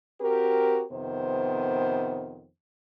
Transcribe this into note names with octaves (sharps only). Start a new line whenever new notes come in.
C4 F#4 G4 A#4
F2 C3 D#3 B3 C5